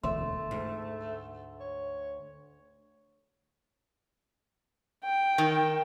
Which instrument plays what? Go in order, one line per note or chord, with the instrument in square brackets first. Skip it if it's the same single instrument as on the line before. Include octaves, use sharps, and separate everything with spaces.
[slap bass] E1 D2 [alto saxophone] A3 [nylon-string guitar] E5 [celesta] C6
[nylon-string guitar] D2 [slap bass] G#2
[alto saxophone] C#5
[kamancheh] G5
[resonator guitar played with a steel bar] D#3